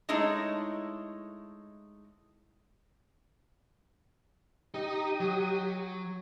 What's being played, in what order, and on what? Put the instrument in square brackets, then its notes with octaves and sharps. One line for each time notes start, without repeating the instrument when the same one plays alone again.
[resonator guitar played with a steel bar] G#3 A3 D#4 E4 C#5
[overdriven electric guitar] D#4 D#5 [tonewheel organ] G4 D#6
[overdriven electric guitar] F#3